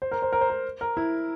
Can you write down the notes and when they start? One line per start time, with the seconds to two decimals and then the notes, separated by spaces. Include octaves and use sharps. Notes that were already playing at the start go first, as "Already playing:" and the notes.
0.02 C5
0.12 A#4
0.22 C5
0.33 A#4
0.41 C5
0.50 A#4
0.81 A#4
0.97 E4